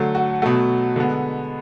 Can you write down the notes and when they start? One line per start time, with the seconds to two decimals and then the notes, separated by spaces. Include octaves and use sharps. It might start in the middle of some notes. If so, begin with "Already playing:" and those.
Already playing: D3 F#3 A3
0.15 F#4
0.42 B2 F#3 A3 F#4
0.96 D3 G#3 B3